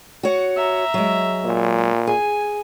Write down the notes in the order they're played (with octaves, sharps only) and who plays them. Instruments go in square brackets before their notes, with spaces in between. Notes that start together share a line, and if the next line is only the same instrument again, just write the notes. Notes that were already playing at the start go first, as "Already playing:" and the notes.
[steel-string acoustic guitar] F#4 C#5 F#5
[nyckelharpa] E5 A#5
[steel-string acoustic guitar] F#3 G#3
[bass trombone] A#2
[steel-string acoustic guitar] G#4 [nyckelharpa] G#5